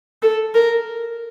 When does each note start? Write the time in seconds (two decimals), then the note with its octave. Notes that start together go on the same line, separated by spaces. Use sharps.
0.22 A4
0.55 A#4